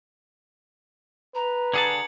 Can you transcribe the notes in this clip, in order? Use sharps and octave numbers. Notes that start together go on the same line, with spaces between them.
B4 A#5
D3 G#4 A5 G#6 C#7 F#7